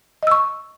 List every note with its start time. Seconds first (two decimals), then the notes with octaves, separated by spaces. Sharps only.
0.23 D#5
0.27 E6
0.31 C#6